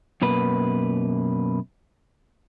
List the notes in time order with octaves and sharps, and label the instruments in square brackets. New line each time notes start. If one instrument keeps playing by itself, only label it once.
[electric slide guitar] F#2 B2 A#3 B4